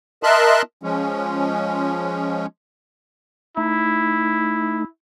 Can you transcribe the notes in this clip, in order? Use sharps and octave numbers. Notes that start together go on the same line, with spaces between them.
A#4 D#5 E5 A5 C6 F#6
F3 G#3 C#4
A3 D#4 E4